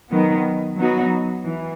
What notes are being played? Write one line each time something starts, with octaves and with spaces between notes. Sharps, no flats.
D#3 F#3 B3
F#3 B3 D#4 F#4
E3